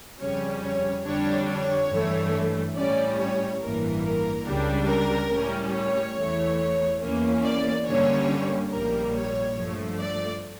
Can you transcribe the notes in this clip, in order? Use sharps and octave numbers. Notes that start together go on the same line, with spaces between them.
F2 C#3 G3 C#4 C#5
C#5
F2 D3 G3 D4 C#5
C#5
G2 E3 A3
A2 G3 C#4 D5
C#5
A1 G2 E3 A#3 A#4
A#4
C#2 C#3 G3 D4
A#4
A2 G3 C#4
C#5
E2 E3 A3
E2 E3 A#3 C#4
D5
G2 D3 G3 A#3 C#4 C#5
A#1 A2 G3 A#3 A#4
C#5
G2 F3 A3
D5